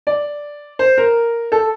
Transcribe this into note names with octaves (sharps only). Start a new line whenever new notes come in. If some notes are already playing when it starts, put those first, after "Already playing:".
D5
C5
A#4
A4